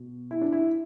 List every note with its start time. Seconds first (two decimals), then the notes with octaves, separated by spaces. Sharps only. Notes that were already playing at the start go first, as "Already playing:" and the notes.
Already playing: B2
0.31 E4
0.41 D4
0.52 E4